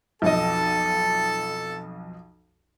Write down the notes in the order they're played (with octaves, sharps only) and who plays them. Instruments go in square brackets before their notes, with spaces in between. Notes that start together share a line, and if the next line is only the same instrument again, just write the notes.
[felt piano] B1 F2 D#5 [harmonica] A4 A5